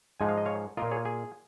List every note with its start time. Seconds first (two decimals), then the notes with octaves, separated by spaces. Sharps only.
0.20 G#2 F3 G#3 D#4 G#5
0.29 F5
0.37 D#5
0.45 C#5 F5
0.77 A#2 A#3 F4 A#4 D#5
0.91 G#4 C#5
1.05 G#4